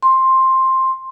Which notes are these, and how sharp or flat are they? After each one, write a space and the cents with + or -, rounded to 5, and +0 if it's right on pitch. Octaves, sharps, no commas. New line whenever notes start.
C6 +10